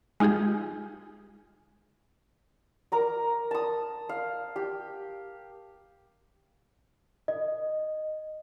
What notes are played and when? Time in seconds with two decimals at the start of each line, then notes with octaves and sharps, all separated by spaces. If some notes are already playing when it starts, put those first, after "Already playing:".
0.20 G#3 D#4 F4 G4 G#4
2.92 A#4 A#5 D6
3.51 A5 D#6
4.09 F5
4.56 G4
7.28 D#5